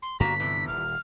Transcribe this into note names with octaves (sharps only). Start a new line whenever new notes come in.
C6
G2 D3 A#3 B3 F#4 A#5 B6
C3 E3 F3
D#1 F6